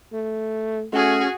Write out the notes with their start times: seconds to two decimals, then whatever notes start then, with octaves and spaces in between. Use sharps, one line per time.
0.13 A3
0.93 A3 C#4 F#4 G#4